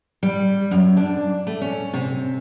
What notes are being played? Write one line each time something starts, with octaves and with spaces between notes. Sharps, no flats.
G3
F#2
D4
A3
C#4
C3